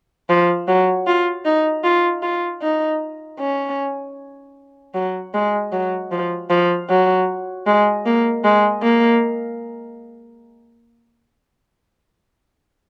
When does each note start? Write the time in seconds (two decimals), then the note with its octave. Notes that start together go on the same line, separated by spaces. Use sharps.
0.29 F3
0.68 F#3
1.07 F4
1.45 D#4
1.84 F4
2.23 F4
2.62 D#4
3.40 C#4
4.95 F#3
5.34 G#3
5.72 F#3
6.11 F3
6.50 F3
6.89 F#3
7.67 G#3
8.06 A#3
8.44 G#3
8.83 A#3